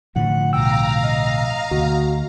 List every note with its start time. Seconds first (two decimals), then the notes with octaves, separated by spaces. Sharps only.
0.16 A2 D3 F3 F#5
0.53 C2 B2 F5 G5 A#5 E6
1.04 D#5
1.71 D2 F#4